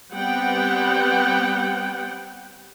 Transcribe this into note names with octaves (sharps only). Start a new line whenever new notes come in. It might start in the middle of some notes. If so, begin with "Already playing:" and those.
G3 B3 C4 F#5 G5